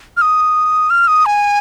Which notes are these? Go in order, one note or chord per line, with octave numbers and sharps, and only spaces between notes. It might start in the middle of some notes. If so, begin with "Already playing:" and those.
F6
D#6
F6
D#6
G#5